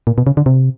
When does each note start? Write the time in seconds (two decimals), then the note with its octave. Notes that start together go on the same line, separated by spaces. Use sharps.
0.07 A#2
0.18 B2
0.27 C#3
0.37 D3
0.46 C3